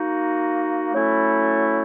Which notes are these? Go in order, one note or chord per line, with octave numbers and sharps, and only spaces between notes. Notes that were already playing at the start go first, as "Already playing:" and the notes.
Already playing: A#3 D#4 F#4
F#3 A3 C#4 E4 A4